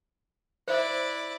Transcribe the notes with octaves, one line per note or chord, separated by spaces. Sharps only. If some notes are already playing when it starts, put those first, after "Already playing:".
E4 C5 D5 E5